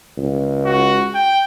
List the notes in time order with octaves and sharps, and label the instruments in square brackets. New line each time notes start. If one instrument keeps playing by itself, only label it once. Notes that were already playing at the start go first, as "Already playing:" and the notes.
[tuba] C#2
[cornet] F#4
G5